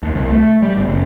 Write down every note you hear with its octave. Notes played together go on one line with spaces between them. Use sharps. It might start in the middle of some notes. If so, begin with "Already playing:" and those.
D#2
C2
A3
G3
G1
F#1